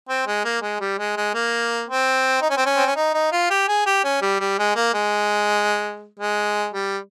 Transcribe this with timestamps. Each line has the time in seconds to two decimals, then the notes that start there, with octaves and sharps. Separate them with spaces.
0.09 C4
0.27 G#3
0.45 A#3
0.62 G#3
0.80 G3
0.98 G#3
1.17 G#3
1.34 A#3
1.89 C4
2.42 D#4
2.50 C#4
2.57 C4
2.66 C#4
2.77 C4
2.87 C#4
2.96 D#4
3.14 D#4
3.32 F4
3.50 G4
3.68 G#4
3.86 G4
4.04 C#4
4.22 G3
4.40 G3
4.58 G#3
4.76 A#3
4.94 G#3
6.19 G#3
6.74 G3